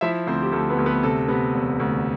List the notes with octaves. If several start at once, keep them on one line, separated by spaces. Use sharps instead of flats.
F3 E4 E5
D2 C4 C5
G4
D2 A4
B3 B4
D2
B3 B4
C3 A4
C3 B3 B4
E1
D2